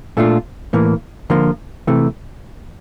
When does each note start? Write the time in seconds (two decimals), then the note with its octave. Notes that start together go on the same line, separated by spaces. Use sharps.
0.17 A#2 A3 D4 F4
0.73 A2 E3 A#3
1.30 D3 F3 A#3 F4
1.87 C3 E3 A3